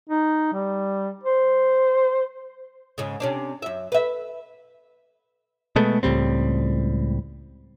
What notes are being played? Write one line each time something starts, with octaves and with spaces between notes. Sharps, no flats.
D#4
G3
C5
G#2 C#3
C3 C#4 D4
F#2 E5
B4 E5
B2 G#3 A3 B3
C#2 A2 G3 C4